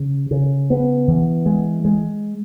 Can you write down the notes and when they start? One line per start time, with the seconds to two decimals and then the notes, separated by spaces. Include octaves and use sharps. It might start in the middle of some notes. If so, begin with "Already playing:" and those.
Already playing: C#3
0.31 C#3
0.70 B3
1.08 E3
1.46 G#3
1.85 G#3